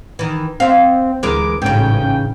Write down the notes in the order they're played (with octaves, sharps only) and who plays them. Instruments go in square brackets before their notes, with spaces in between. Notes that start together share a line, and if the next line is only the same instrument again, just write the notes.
[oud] D#3 E3
[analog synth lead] C4 [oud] E5 F5
[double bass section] D2 [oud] E3 G#3 A#4 [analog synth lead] D6
[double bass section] A1 C#4 [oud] G#2 C#3 [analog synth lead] G5